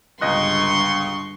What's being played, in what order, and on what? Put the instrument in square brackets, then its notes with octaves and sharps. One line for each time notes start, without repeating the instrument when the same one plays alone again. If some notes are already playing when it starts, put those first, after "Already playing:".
[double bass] G1 [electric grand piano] C#2 D#5 F#6 [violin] C6 C#6